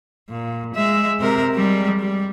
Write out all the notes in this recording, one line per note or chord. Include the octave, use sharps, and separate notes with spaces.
A#2
G#3 E5
C3 A#4
G3 G#3
G3